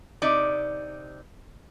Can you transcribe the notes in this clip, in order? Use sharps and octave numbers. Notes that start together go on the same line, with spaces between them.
C3 D#4 D5